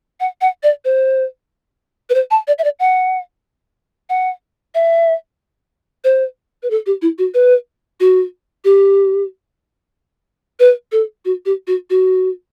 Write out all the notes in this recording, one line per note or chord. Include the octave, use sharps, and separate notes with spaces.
F#5
F#5
D5
C5
B4
C5
A5
D5
E5
D5
F#5
F#5
E5
C5
B4
A4
G4
E4
F#4
B4
F#4
G4
B4
A4
F#4
G4
F#4
F#4